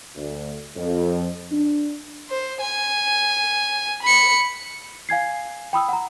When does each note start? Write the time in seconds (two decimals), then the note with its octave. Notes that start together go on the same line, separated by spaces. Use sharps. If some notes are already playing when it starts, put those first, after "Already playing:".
0.16 D2
0.76 F2
1.52 D4
2.30 C5
2.61 G#5
4.03 B5 C#7
5.09 F5 G#5 G#6 C7
5.73 G5 B5 D#6 E6
5.89 F#5 A#5